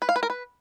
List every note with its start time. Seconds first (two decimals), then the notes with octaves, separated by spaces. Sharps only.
0.02 B4
0.09 F5
0.16 B4
0.23 A#4
0.30 B4